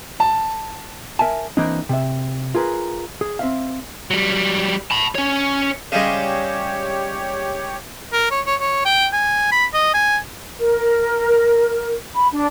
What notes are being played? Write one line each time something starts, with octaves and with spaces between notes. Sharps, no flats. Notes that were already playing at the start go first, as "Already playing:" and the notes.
A5
A#4 E5 G#5 A5
E3 A#3 C4 D4 D#4
C3 E5
F4 G#4 A#4 B4
G#4
C4 E5 F5
F#3 G3
A5 B5
C#4 C#5
C#3 G3 G#3 G4 C#5
A#4
C#5
C#5
C#5
G5
G#5
B5
D#5
G#5
A#4
B5
D4